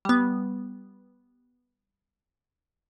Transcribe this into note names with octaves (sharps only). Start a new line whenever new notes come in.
G3 B3